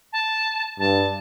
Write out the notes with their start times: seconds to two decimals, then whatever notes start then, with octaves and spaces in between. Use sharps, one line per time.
0.13 A5
0.80 G2 A5